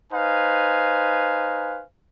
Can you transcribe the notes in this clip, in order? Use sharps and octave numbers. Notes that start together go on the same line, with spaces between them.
D#4 B4 C5 F5 G#5